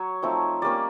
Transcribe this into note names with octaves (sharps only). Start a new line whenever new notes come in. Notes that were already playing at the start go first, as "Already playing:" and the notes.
Already playing: F#3 C#5
F3 A3 C4 D#4
G3 A#3 C#4 D5